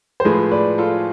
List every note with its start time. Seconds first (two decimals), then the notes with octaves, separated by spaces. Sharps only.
0.20 C5
0.25 A2 F3 G#3 G#4 B4
0.51 B4 D5
0.78 F4 A4